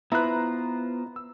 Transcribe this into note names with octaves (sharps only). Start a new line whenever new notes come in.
B3 E4 F4 B4 C5 A#5 F#6
E6